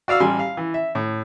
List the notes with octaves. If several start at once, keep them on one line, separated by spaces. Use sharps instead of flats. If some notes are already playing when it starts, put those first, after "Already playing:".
F#4 D5 F5 E6 F6
A1 G3 G#5 C6 F6
F5
E3
E5
A2